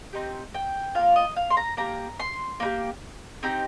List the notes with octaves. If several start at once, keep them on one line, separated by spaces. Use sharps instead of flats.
C4 D#4 G4
G5
A#3 F4 F5
D#5
F5
C6
A#5
A#3 G4 A#5
C6
A#3 D#4 G4
C4 D#4 G4